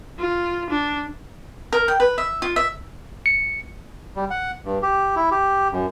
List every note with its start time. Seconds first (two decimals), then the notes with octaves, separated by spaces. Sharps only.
0.19 F4
0.70 D4
1.73 A#4
1.88 G5
2.00 B4
2.18 E5
2.42 F4
2.56 E5
3.26 C#7
4.16 G3
4.30 F#5
4.65 G2
4.83 G4
5.16 E4
5.31 G4
5.73 F#2